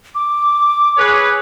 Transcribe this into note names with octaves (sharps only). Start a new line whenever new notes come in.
D6
G#4 B4 C#5